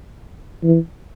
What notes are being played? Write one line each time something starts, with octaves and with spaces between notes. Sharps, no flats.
E3